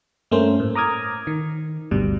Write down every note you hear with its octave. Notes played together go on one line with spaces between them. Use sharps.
G2 A3 A#3 C#4 A#4 C5
A2
A#5 D6 D#6 F6 G#6
D#3
G1 D2 G2 B2 G3